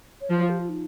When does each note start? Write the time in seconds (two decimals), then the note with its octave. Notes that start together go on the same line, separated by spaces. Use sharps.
0.21 C#5
0.30 F3 C5
0.40 C5
0.50 G4
0.59 F4
0.69 D#4